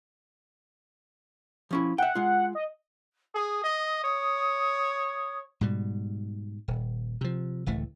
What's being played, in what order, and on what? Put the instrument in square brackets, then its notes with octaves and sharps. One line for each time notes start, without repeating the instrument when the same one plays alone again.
[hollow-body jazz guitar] F3 C#4 E4
[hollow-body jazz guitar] E5 G5 [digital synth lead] F#5
[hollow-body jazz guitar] G#3 F4
[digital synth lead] D#5
[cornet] G#4 [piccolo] D#6
[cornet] D#5
C#5
[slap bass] G#2 B2 G3
D#1
C3 F3
D1 C#2 E3 A3